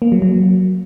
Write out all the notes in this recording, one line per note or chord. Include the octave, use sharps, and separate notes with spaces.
A#3
F#3
F#3